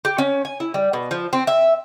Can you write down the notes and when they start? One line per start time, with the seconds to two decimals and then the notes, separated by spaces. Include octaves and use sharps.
0.05 G4
0.18 C#4
0.45 G#5
0.60 E4
0.74 G3
0.93 B2
1.11 F3
1.33 C4
1.47 E5